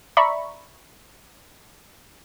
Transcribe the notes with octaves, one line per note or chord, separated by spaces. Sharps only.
D5 E5 A#5 B5 C#6